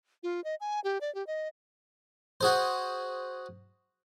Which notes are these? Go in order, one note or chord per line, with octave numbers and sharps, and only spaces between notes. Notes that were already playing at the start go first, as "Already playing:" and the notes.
F4
D#5
G#5
G4
D5
G4
D#5
F#4 G#4 C5